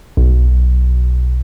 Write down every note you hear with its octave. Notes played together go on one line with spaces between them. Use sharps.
B1